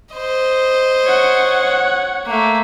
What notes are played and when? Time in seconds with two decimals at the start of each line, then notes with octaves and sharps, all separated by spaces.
0.14 C5 D#5
1.05 C#5 F#5
2.26 A3 A#3